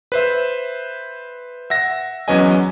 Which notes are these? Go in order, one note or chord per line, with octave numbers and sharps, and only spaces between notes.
B4 C5 E5
E5 F#5 A#6
E2 F#3 C#4 B4 D#5 G#5